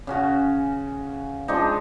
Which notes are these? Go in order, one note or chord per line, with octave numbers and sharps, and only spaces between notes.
C#3 C#4 F#4
F3 G#3 D4 D#4